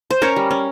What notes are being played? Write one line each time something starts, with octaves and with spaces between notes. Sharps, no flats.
C5
C#4 A#4 C#5
G3
C#4